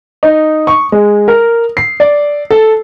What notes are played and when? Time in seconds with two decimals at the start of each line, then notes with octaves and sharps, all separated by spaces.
0.23 D#4
0.67 C#6
0.92 G#3
1.28 A#4
1.77 C7
2.00 D5
2.50 A4